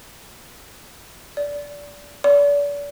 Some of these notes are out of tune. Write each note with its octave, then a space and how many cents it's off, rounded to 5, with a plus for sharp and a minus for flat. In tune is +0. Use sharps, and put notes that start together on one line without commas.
D5 -20
D5 -40